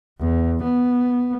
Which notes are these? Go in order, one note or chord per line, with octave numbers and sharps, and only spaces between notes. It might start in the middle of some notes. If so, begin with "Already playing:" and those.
E2
B3